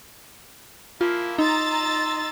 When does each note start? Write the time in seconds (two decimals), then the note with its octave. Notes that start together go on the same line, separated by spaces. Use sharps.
1.01 F3 A#3 E4 F4
1.39 D#4 D#5 A#5 C6 E6 A6